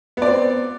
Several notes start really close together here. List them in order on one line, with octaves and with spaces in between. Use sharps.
B3 D5 C4